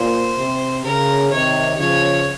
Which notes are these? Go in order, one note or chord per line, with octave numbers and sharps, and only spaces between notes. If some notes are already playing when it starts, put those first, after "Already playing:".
Already playing: A#2 C5
C3
C#3 A#4
C3 D#3 C#5
C#3 F3 C#5